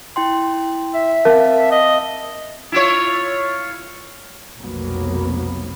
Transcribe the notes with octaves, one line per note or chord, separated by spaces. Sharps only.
E4 G5 C6
E5
C4 A#4 F5 A5
D#5
E4 F4 C#5
F1 B1 F2 F#3 A#3 B3